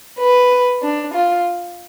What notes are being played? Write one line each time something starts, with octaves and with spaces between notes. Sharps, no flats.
B4
D4
F4